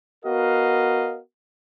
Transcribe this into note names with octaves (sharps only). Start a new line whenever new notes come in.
B3 F#4 A#4 D#5 F5